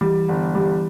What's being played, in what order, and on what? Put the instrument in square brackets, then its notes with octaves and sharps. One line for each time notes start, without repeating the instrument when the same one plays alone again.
[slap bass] E3 [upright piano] G3
[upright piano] G1
G3